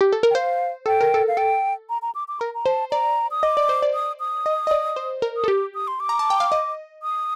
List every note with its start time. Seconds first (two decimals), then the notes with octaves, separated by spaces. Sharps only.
0.01 G4
0.13 A4
0.23 A#4
0.30 G5
0.34 C5 F5
0.86 A4 G5
1.01 A#4
1.14 A4
1.28 F5
1.37 A4 G5
1.89 A#5
2.02 A#5
2.15 D6
2.28 D6
2.40 A#4 A#5
2.54 A#5
2.66 C5 A5
2.91 D5 A#5
3.31 D#6
3.43 D#5 D6
3.57 D5
3.69 C5
3.82 D5
3.94 D#6
4.20 D#6
4.46 D#5
4.67 D#5
4.71 D5
4.96 C5
5.22 A#4
5.37 D#6
5.44 A4
5.48 G4 D6
5.75 D#6
5.88 C6
6.00 D6
6.09 A#5
6.19 A5
6.30 G5
6.40 F5
6.52 D#5
7.03 D#6